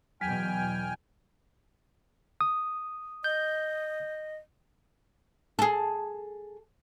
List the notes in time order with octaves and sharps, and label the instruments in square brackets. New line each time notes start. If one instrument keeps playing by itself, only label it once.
[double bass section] E2 B2 [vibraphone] F#3 [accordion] G5 G#5 F6
[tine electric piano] D#6
[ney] D#5 [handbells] G6
[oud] G#4 A4